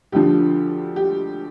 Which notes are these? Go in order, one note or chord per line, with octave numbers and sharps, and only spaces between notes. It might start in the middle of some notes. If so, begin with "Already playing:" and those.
D2 D3 F3 G4
G4